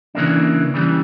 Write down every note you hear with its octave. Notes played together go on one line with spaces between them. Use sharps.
C#3 E3 G3 A#3 D4
C#3 E3 G3